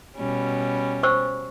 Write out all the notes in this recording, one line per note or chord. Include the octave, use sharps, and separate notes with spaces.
B2 G3 C#4
C5 C#6 E6